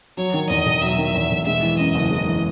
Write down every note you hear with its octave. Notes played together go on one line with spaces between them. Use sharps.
F#3 C#5
D#3
E2 D#5
E1
F#3 E5
D#3
E2
E1
G#3 E5
E3
F#2 D#5
F#1
G#3
E3